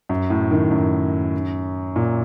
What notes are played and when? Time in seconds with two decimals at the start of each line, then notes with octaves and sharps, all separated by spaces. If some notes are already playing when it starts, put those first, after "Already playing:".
0.09 F#2
0.30 A2
0.51 D#3
0.71 F#2
1.96 A#2